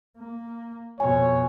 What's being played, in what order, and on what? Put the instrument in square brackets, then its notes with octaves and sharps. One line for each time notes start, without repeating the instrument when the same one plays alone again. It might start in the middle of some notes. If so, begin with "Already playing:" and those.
[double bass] A#3
[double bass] F2 B2 [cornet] C#5 [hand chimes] G#5